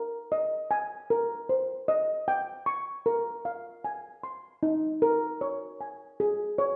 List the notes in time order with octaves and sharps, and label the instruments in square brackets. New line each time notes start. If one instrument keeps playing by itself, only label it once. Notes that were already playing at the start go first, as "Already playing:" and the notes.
Already playing: [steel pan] A#4
D#5
G#5
A#4
C5
D#5
G5
C#6
A#4
F5
G#5
C6
D#4
A#4
C#5
G#5
G#4
C#5